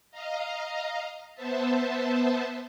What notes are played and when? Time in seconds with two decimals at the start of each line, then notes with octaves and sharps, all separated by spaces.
0.11 D#5 F5 A#5
1.34 B3 C5 E5 A5